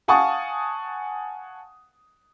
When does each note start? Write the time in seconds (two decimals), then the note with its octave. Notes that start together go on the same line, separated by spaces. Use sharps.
0.08 F5 F#5 G#5 A5 C#6 D#6